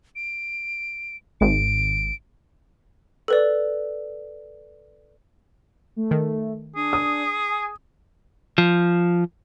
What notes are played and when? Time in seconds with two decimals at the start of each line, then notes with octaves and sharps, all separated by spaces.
0.16 D7
1.41 G#1 D7
3.28 A4 B4 D5
5.96 A3
6.11 D#3
6.76 D4 G#4
6.93 D#6
7.49 G#5
8.58 F3